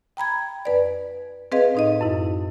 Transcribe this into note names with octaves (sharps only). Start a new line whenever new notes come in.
G5 A#5 B5 G#6
F2 B4 D5
C4 G#4 B4 D#5 F5
A2 D#4 D#5
F#2 E4